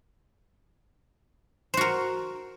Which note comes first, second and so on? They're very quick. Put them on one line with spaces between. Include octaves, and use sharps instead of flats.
C5 F#4 A#4